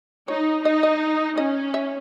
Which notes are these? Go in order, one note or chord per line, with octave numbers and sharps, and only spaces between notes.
D#4 C#5
D#4 D#5
D#5
C#4 D#5
E5